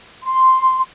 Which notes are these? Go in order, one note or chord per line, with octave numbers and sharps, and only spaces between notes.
C6